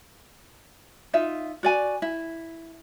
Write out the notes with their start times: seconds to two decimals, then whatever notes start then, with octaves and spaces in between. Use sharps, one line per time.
1.13 D#4 F4 E5
1.63 F#4 D5 G#5
2.02 E4